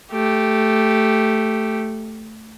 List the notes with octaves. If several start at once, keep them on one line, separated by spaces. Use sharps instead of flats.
A3 G4